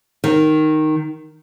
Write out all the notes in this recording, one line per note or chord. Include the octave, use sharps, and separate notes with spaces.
D#3